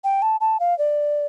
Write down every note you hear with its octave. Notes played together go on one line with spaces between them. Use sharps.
G5
A5
A5
F5
D5